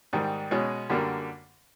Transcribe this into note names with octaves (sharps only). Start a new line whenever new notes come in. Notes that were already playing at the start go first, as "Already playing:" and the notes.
G#2 D#3 G3
B2 G#3 C#4
F#2 D3 G3 A#3 D4